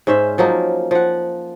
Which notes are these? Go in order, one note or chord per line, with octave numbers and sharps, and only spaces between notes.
G#2 C#4 C5 E5
F3 F#3 A#3 D#4
F3 F#5